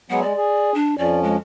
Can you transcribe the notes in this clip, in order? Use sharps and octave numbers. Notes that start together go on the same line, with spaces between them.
F#3 G#3 B3 F#5
G#3 D5
G#4
D4
F2 F3 C#4 D5
G#3